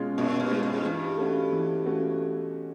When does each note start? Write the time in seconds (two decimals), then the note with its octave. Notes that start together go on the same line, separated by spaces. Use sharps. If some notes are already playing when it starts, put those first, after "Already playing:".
Already playing: B2 G#3 C#4 F4
0.18 F#2 B2
0.40 G2
0.51 G#3 C#4 F4
0.63 G#2
0.85 G2 E3
1.18 A3 C#4 F#4
1.52 E3
1.86 A3 C#4 F#4